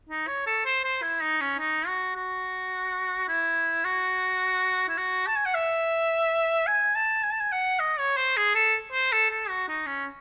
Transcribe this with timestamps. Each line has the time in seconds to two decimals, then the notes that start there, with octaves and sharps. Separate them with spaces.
0.09 D#4
0.28 C#5
0.47 A4
0.66 C5
0.84 C5
1.02 E4
1.21 D#4
1.41 C#4
1.59 D#4
1.87 F#4
2.16 F#4
3.28 E4
3.85 F#4
4.89 E4
4.97 F#4
5.27 A5
5.36 G#5
5.46 F#5
5.55 E5
6.67 G#5
6.95 A5
7.23 G#5
7.32 A5
7.40 G#5
7.52 F#5
7.80 D#5
7.99 C#5
8.17 C5
8.37 G#4
8.55 A4
8.93 C5
9.12 A4
9.31 A4
9.49 F#4
9.68 D#4
9.86 C#4